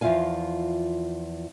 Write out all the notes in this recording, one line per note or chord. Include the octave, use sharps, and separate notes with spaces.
E2 F3 F4 E5 F5 G#5